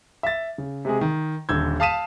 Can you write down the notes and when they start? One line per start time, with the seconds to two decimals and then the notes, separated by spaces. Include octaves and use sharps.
0.23 E5 A6
0.58 C#3
0.85 C3 G#3 G#4
1.01 D#3
1.49 D#1 D3 E6 G6 G#6
1.80 F5 A5 D#6 B6 D#7 E7